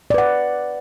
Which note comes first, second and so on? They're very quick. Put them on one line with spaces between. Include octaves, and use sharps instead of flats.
D5 B4 F#5